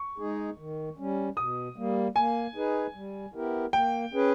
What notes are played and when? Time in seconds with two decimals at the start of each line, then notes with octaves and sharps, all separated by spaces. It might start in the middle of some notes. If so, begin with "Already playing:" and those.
Already playing: C#6
0.18 G#3 D#4 G#4
0.58 D#3
0.97 G3 C#4
1.37 B2 D#6
1.76 G3 A#3
2.15 A#3 G#5
2.55 D#4 G#4 B4
2.94 G3
3.34 B3 E4 G4 A#4
3.73 A#3 G5
4.13 C#4 G#4 B4